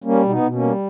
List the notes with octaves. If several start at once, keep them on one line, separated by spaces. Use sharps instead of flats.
G3 A#3 C#4
B2
B3 D#4
B2
A#3 C#4
G3